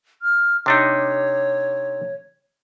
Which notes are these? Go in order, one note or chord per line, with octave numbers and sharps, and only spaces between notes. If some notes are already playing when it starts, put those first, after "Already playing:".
F6
C3 D4 D#4 C#5